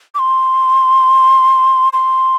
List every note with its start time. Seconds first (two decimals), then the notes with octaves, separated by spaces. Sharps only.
0.15 D6
0.19 C6
1.93 C6